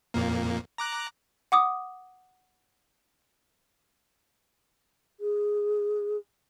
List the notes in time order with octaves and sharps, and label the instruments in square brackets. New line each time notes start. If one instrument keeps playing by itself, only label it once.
[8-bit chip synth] F2 A#2 A#3
A#5 D6 F#6
[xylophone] F#5 D6 D#6
[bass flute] G#4